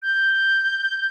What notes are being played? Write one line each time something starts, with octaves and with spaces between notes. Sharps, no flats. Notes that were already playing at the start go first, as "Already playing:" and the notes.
G6